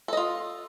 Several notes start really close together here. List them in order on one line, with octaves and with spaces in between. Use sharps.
A4 D#5 F4